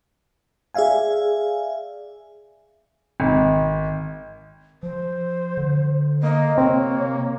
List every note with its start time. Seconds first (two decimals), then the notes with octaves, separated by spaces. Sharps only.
0.74 G#4 D5 E5 F5 G#5
3.20 G#1
4.83 F3 C5
5.57 D3
6.23 A#3 D#5
6.58 C3 C4 C#5